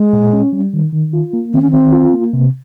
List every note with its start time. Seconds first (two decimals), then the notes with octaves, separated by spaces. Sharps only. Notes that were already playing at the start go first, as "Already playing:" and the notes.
Already playing: G#3
0.13 A#2
0.33 C#4
0.53 G3
0.73 D#3
0.93 D#3
1.13 F4
1.33 A#3
1.53 D#3 C4
1.62 C#4
1.71 D#3 C4
1.93 F4
2.13 A#3
2.33 C3